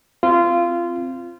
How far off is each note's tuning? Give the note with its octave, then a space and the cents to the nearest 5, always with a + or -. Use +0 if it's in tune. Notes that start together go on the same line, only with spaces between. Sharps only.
C4 +0 F4 -20